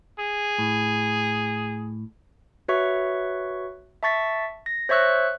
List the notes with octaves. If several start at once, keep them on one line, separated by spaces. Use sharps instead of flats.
G#4
A2
F#4 B4 C#5 E5 C#6
E5 A5 C#6 A6 B6
A#6
C5 C#5 E5 C#6 E6 F#6